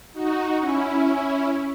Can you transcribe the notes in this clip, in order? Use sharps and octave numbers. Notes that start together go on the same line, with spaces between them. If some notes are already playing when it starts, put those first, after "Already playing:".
D#4 F#4
C#4 E4